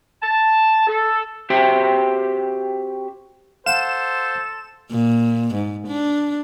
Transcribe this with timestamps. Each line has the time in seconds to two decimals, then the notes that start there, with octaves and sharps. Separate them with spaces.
0.22 A5
0.87 A4
1.50 C4 F#4 G4 C5 E5 G5
3.66 A4 C5 F5 F#5 E7
4.91 A#2
5.55 G#2
5.88 D4